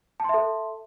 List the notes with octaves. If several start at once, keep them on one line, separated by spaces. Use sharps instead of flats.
A4 E5 A5 C6